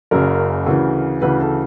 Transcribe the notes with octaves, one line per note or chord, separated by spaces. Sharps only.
F#1 F#2 C#3 A#4
D2 C#3 E3
D2 C#3 E3 B4
A4